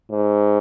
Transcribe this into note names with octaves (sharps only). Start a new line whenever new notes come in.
G#2